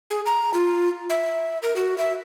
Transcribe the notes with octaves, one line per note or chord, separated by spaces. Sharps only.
G#4
A#5
F4
E5
A#4
F#4
E5